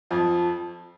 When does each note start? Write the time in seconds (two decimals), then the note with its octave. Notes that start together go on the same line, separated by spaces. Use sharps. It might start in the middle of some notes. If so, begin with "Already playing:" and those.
0.11 F2 F3